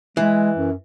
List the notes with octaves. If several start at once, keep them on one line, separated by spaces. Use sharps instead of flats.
E3 G#3
F#2